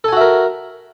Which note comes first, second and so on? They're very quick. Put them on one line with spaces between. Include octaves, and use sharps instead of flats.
A4 G#5 F#4 E5 A#4